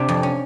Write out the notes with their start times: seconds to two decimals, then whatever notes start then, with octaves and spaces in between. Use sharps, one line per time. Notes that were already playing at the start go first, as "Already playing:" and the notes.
Already playing: C3 D4
0.09 F2
0.23 C#4